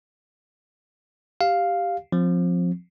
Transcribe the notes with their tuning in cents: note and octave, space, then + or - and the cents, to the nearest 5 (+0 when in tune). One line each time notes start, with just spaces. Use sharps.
G4 +0 F5 +0
F3 +15 C4 +0